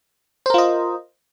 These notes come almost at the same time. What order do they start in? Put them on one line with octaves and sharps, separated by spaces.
C5 A#4 F4 D#5